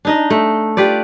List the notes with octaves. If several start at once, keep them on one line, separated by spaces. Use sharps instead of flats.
D4 D#4 D#5
A3
F4 G4 B4 D5